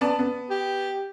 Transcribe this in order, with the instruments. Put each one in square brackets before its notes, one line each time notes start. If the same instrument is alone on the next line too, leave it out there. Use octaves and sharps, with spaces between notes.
[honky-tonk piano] B3 D5 A5
B3
[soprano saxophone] G4